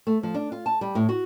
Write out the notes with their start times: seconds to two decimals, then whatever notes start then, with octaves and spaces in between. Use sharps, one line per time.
0.07 A3
0.23 F3
0.34 D4
0.52 F4
0.66 A5
0.81 G3
0.95 A2
1.09 F#4